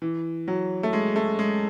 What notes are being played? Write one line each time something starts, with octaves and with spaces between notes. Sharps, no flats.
E3
F#3
A3
G#3
A3
G#3